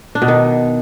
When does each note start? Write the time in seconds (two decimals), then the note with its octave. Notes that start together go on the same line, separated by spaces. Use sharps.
0.15 D4
0.22 B2
0.28 D#3